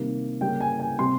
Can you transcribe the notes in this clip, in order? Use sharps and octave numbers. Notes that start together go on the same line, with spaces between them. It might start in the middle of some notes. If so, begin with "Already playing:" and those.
Already playing: C3 D#3 G3 A#3
C#3 G3 A#3 G5
G#5
G#5
C3 G3 C4 C6